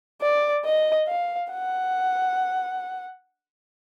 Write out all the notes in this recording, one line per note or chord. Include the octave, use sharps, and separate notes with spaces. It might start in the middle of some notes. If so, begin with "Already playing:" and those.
D5
D#5
F5
F#5